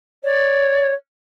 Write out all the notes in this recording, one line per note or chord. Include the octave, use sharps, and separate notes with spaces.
C#5 D5